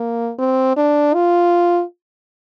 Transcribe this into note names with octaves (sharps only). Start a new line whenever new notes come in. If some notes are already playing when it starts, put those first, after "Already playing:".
Already playing: A#3
C4
D4
F4